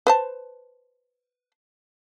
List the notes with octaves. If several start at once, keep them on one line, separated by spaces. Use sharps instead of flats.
B4 C5 A5